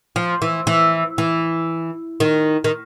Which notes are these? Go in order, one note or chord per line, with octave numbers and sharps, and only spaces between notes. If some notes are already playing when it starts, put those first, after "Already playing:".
F3
E3
E3
E3
D#3
D#3